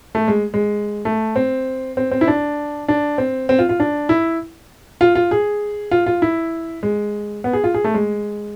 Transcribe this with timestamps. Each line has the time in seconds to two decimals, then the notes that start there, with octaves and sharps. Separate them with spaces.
0.15 A3
0.28 G#3
0.54 G#3
1.05 A3
1.36 C4
1.97 C4
2.11 C4
2.21 E4
2.28 D4
2.88 D4
3.18 C4
3.49 C4
3.59 F4
3.69 F4
3.80 D4
4.09 E4
5.01 F4
5.15 F4
5.31 G#4
5.91 F4
6.06 F4
6.22 E4
6.83 G#3
7.44 B3
7.53 G#4
7.64 F4
7.74 G#4
7.84 A3
7.94 G#3